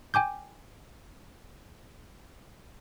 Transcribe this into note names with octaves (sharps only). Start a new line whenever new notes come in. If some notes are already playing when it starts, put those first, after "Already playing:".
G5 G#5 D6 G6